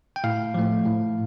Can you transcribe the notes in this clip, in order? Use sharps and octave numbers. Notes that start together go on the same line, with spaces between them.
G5
A2 F5
F3 A3
A2